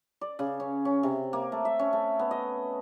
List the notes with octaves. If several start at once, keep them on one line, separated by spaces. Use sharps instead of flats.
D5
C#3
C#4
C#4
C3
A#3
A3
E5
C#4
A3
B3
D#5